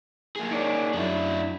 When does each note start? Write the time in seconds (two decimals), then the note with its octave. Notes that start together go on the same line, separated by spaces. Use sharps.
0.36 A#3 G#4
0.51 D#4 C#5 D5
0.93 F#2 D4 E4